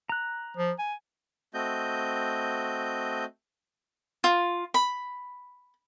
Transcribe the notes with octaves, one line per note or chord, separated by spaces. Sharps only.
A#5 F#6
F3
G#5
A3 C4 F#4 D#5 G6
F4
B5